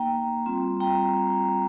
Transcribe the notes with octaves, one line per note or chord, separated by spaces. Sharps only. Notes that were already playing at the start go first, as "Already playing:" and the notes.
Already playing: A#3 D#4 G5 A#5
G3 C4 F4
G5 A#5